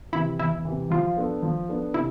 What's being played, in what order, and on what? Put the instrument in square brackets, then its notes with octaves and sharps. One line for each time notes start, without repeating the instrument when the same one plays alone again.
[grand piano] C3 E3 [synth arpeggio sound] E4
[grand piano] E2 [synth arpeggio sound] E4
[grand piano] C3 E3
[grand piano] F3 [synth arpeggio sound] F4
[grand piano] B3 D4 A4
F3
B3 D4 A4
[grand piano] C3 [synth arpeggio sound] E4